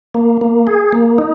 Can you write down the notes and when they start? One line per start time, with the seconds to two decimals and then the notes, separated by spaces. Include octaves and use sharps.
0.14 A#3
0.41 A#3
0.67 G#4
0.93 A#3
1.18 D#4